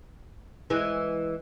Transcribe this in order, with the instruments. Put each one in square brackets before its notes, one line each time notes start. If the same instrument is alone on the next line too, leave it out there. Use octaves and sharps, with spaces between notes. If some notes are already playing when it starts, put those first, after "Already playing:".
[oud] E3 G#3